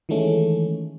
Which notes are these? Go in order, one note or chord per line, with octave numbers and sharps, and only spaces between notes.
D#3 E3 G#3 A3 C#4